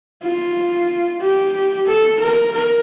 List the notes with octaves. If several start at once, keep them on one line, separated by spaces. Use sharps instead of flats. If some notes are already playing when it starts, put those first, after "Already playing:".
F4
G4
A4
A#4
A#4